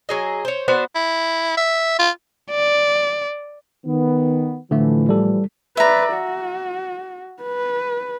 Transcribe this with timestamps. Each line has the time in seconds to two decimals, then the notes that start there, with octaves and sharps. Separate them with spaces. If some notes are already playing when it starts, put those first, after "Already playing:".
0.09 F#3 G#4 D#5
0.45 C5 C#5
0.68 B3 D4 F#4 C5
0.95 E4
1.57 E5
1.99 F4
2.51 D5
3.86 D#3 B3
4.71 A2 D3 E3 F3 A3
5.09 G3 A4
5.77 B4 D5 E5 A#5
6.14 F#4
7.43 B4